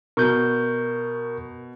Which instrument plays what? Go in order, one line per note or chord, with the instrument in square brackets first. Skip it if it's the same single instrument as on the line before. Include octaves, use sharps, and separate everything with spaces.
[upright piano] B2 [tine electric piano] A#4 C#6 G6